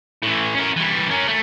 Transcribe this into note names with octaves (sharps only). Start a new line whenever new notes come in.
A2 E3
C#4 A#4
E3 G3
C#4 A#4
A3